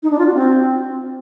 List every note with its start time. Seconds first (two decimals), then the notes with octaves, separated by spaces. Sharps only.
0.03 D#4
0.11 D4
0.19 F4
0.26 F#4
0.34 C4